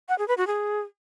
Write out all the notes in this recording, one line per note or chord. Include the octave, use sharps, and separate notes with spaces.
F#5
G#4
B4
F#4
G#4